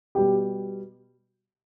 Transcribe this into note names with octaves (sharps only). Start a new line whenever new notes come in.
B2 G3 G4